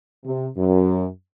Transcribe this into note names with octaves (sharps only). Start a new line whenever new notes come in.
C3
F#2